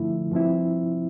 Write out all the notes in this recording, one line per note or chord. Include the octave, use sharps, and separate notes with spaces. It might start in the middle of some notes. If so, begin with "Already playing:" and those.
Already playing: G2 D3 F3 A3 E4
G2 F3 C4 E4